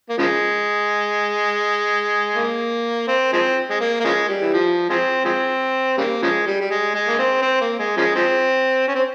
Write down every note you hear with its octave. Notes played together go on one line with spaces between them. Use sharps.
A#3
C#3 F3 G#3
A#3
C4
F3 G#3 C4
G#3
A#3
A#3
C#3 F3 G#3
G3
E3
F3
F3 G#3 C4
F3 G#3 C4
C#3 G3 A#3
C#3 F3 G#3
G3
G3
G#3
G#3
A#3
C4
C4
A#3
G#3
C#3 F3 G#3
F3 G#3 C4
C#4
C4